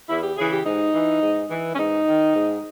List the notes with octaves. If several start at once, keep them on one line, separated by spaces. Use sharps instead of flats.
E2 E4
G4
C#3 E3 G#4
G4
G#2 D#4
E3
G#2
E3
C#4
G#2 D#4
D#3
G#2